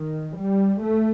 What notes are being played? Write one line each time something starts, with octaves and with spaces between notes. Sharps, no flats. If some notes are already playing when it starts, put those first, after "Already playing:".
Already playing: D#3
G3
A3